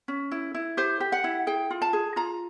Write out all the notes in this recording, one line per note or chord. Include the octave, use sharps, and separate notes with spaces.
C#4
E4
E4
G4 C5
G4
F#5
E4
G#4 G5
F4
A5
G#4
F4 A#5